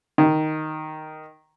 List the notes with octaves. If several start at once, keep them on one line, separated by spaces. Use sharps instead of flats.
D#3